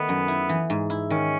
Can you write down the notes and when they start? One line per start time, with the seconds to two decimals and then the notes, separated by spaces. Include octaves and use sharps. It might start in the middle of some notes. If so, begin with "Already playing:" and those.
Already playing: D#3 A3 B3
0.09 F#2
0.28 E4
0.49 E3
0.70 G#2
0.90 E4
1.10 D#3 C#4